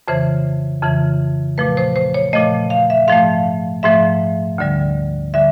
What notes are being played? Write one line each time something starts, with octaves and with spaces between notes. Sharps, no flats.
F2 C#3 E3 C5
F2 C#3 E3
A#2 F3 A3 B4
C5
C5
C#5
A#2 F3 A3 D#5
F5
E5
G#2 F3 A3 F5
G#2 F3 A3 E5
D2 D3 G3
D3 G3 E5